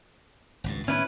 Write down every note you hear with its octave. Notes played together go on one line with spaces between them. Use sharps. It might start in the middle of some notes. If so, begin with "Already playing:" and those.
G#1 C#2 G2
A2 D#3 B3 C#4 E4 B4